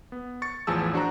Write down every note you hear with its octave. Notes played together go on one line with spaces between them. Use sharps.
B3
C#6 A6 C#7
A1 E2 F3 G#4 A5 E6
D4 F#4 C5 A#5